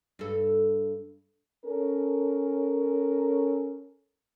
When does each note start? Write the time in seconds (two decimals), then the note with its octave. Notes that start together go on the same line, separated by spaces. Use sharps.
0.19 G2 A4
1.65 C#4 A4 A#4